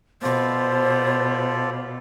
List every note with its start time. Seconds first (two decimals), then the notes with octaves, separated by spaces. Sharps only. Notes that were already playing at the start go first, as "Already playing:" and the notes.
0.22 B2 F4 A4 C5 D5